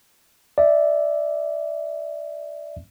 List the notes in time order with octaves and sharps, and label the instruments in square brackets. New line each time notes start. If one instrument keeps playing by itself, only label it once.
[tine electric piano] D5 E5